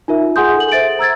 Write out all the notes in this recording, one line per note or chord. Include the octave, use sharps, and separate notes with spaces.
D#4 F4 A#4 E5
G#4 F#5 G#5 C6 D#6 G6
A4 F#7
C5 E5 A6 D7
A#5 E6 G#6 A6